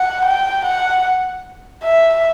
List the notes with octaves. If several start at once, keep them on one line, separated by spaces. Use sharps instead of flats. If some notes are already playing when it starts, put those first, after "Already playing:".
Already playing: F#5
G5
F#5
E5